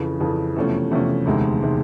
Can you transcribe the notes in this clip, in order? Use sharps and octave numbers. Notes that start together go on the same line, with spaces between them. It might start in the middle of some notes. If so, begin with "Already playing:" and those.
Already playing: F2 C#3 E3
F2 C#3 E3
E2 C3 F3 A3 C#4
E2 C3 F3 A3 C#4
E1 D2 C3 D#3 G#3
C3 D#3 G#3